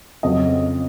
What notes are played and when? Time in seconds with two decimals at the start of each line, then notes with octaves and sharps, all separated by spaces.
0.23 F2 C#3 F#3 D#5